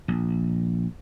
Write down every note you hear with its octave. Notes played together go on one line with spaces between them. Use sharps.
A#1